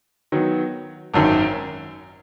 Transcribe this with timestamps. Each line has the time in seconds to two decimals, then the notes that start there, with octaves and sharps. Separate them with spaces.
0.32 D#3 F#3 B3
1.14 G#1 F#2 D#3